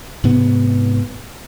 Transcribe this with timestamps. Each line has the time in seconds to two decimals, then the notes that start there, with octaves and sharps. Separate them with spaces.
0.24 G#2 C3 B3